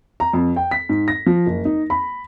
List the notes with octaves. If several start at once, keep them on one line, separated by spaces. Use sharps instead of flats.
A#5
F2
G5
B6
G#2
A#6
F3
F#1
D#4
B5